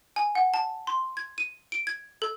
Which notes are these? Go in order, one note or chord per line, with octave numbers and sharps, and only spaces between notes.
G#5
F#5
A5
C6
G#6
D#7
D7
G#6
A4